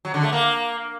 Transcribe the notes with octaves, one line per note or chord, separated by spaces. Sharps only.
F#3
D3
A3
A#3